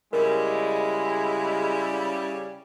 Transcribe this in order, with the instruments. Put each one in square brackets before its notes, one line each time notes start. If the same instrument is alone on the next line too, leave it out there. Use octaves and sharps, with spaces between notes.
[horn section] C#3 G3 [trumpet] G#3 [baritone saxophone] E4 [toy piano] A#4